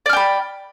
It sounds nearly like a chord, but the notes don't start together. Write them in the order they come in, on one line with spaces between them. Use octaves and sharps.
D5 F6 G5 B5